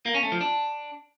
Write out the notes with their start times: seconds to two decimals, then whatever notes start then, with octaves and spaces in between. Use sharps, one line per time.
0.06 A#3
0.14 C#4
0.23 A3
0.32 F3
0.41 D4